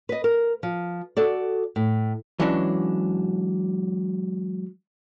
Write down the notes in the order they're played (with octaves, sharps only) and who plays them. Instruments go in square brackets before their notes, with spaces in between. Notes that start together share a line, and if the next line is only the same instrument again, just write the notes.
[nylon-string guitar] B4 D#5
A#4
F3
F#4 A4 D5
A2
[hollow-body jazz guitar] E3 F#3 G#3 C#4 D4